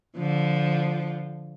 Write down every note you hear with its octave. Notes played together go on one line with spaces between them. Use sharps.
D3 F3